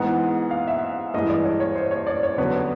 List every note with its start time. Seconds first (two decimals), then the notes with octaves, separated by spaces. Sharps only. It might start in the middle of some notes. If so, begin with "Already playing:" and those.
Already playing: G#2 E3 G#3 B3 F#5
0.51 F5
0.68 E5
1.14 G2 E3 G#3 D#5
1.30 D5
1.45 C#5
1.60 C#5
1.75 C5
1.91 C#5
2.07 D5
2.23 C#5
2.38 D3 F#3 B3 B4